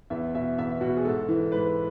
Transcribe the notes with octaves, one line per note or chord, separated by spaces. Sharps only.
E2 E5
B2 E5
E2 E5
B2 F#4
G#4
G#2 A4
E3
G#2 B4